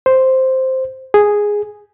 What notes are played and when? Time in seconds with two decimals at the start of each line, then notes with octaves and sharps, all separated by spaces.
0.06 C5
1.14 G#4